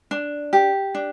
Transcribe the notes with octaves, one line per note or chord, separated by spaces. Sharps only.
D4
G4
D4